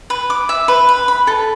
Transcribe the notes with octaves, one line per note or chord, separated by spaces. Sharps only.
B4
D6
E5
B4
B4
B5
A4